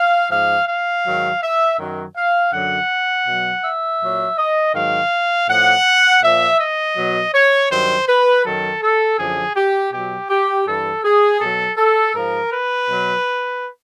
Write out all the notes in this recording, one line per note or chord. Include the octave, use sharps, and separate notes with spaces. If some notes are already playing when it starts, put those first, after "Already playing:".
Already playing: F5
G#2 F3 F5
F5
G#2 D#3 F#3
E5
F#2 D#3 F#3
F5
F#2 D3 F#3 F#5
B2 F#3
E5
A#2 F#3
D#5
G#2 D#3 F#3 F5
A2 F3 F#5
A#2 F3 E5
D#5
B2 F#3
C#5
G2 D#3 F#3 C5
B4
F#2 D#3 F#3 A4
A4
F#2 D3 F3 G#4
G4
B2 F#3 G4
G4
G2 E3 A4
G#4
B2 F#3 A4
A4
G#2 F3 A#4
B4
B2 F#3